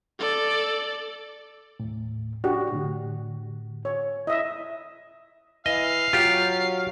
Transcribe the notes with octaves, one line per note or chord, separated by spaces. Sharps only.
A4 D5
D#2 A2
D4 F#4 G4 D5
A2 D3
C#5
E4 D#5 E5
E3 D#5 F5
F#3 F4 G4